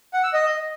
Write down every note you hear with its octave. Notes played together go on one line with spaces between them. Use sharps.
F#5
E6
D#5